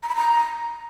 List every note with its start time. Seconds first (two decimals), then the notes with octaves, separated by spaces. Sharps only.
0.03 A#5
0.09 B5
0.16 A#5